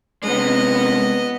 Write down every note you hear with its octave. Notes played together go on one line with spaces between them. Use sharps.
C3 G#3 B3 D#5